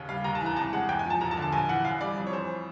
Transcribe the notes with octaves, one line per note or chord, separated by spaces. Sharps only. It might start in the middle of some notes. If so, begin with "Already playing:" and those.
Already playing: D#2 C#3
G3 F5
D#2 A#5
A5
E3
A#5
C2 A5
G#3 F#5
E2 G5
G#5
F3
A5
E1 A#5
A5
D3
A5
A#1 G#5
E3 F#5
F#2 F5
G3 D5
F2
C#5
E3 C5